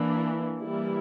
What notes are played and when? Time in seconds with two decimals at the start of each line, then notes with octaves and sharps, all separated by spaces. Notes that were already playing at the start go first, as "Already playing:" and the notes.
Already playing: E3 A#3 D4
0.58 E3 G3 A#3 E4